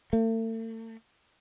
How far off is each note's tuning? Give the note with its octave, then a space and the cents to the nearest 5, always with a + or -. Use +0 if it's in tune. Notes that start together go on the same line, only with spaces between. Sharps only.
A3 +40